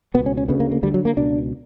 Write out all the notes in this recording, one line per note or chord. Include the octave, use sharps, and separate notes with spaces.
C#2 B2 B3
C#4
C#4
D2 C#3 B3
A#3
A#3
D2 D3 G3
F#3
A#3
C#2 B2 D4